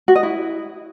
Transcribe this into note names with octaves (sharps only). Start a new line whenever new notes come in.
F#4
D#5
E4